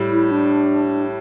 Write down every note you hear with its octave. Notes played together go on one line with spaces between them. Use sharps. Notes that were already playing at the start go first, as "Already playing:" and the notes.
Already playing: A2 G3
E4
D4